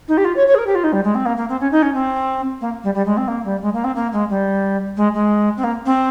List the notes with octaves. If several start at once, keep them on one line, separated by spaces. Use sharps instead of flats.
D#4
G4
F4
C#5
C#5
G#4
A#4
G4
F4
D#4
G3
G#3
C4
A#3
A#3
C4
C#4
D#4
C#4
C4
A#3
G3
G3
G#3
C4
A#3
G3
G#3
A#3
C4
A#3
G#3
G3
G#3
G#3
C4
A#3
C4